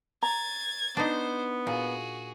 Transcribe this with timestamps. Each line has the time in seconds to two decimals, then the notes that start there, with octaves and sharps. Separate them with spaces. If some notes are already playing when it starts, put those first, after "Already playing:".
0.23 A#5 G#6 A6
0.97 B3 D4 D#4 C5
1.67 A#2 F#4 G#4